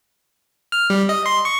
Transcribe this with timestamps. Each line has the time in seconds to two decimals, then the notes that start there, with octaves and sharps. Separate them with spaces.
0.72 F6
0.90 G3
1.09 D#5
1.26 C6
1.45 C#6